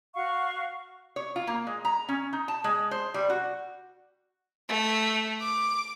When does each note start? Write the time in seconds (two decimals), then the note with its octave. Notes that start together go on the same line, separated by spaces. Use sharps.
0.14 F#4 F5 F#5 C#6
1.16 C#5
1.36 F4
1.47 A#3
1.67 G#3
1.85 A#5
2.09 C#4
2.33 D#4
2.48 A5
2.64 G#3
2.91 C5
3.14 G3
3.30 F#4
4.69 A3
5.41 D6